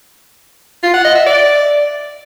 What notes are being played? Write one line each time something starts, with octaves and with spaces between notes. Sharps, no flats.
F4
F#5
D#5
E5
D5